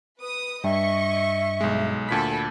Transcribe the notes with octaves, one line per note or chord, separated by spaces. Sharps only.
B4 D#6
G2 D#5 E5 C#6
B1 G#3
D2 A#2 A4 B5 B6